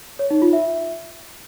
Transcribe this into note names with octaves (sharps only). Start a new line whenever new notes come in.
C#5
D#4
F4
E5